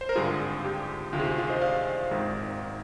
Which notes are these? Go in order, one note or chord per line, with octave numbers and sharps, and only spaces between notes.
C5
A#4
G#1 G2 D3 F4 G#4
G4
D2 C3 D#3 F4
G#4
G4
F4
C5 D#5
D5 F5
G#1 G#2 D#3